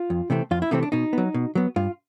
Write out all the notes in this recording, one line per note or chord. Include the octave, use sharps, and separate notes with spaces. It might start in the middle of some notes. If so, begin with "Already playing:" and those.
Already playing: F4
F2
C3 E3 A3 C4
F2 F4
E4
C3 E3 A3 C4 D#4
D4
B2 D#4
F#3 B3
B2
F#3 B3
G2 F4